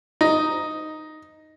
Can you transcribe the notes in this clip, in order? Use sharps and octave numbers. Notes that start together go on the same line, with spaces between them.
D#4